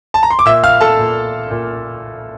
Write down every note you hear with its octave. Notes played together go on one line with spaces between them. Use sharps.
A5
A#5
C6
D6
A#2 E5 E6
F5 F6
A4 A5
A#2
A#2